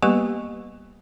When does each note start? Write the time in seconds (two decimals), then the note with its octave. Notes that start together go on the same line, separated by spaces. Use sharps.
0.03 G3 A#3 B3 G4 B4 C#6